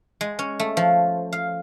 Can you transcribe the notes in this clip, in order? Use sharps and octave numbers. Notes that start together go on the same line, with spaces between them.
G#3
C#4
A3
F3
F5